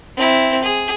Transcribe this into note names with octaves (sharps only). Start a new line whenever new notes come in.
C4 E4
G#4